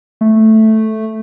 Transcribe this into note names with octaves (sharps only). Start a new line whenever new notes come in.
A3